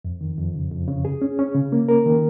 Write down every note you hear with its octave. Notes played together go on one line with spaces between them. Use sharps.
F2
D#3
F2
C#3
F2
C#3
G#4
C#4
C#4
C#3
A#3
A#4
D#3